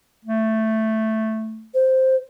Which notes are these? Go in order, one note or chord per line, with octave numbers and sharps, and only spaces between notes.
A3
C5